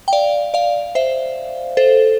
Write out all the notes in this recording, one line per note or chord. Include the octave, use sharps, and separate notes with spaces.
G5
D5 F5
D5 F5
C5 E5
A4 C5